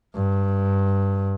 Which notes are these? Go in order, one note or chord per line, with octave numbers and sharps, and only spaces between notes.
G2